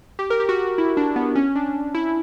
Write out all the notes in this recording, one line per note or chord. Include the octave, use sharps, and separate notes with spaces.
G4
A#4
G4
F#4
E4
D4
B3
C#4
D4
E4